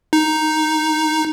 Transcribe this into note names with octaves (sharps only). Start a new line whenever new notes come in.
D#4